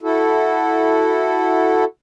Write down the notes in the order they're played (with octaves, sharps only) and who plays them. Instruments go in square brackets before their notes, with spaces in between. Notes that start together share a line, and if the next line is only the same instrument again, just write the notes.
[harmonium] E4 F#4 A4